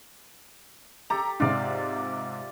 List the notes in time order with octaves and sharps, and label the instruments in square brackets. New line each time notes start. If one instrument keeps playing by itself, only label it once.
[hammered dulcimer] G4 A4 [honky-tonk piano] A#5
[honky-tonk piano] G#2 C3 [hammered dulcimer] F4 D5